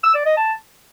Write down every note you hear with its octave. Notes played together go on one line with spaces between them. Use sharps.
E6
D5
D#5
A5